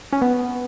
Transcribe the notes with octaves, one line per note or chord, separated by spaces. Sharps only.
C#4
B3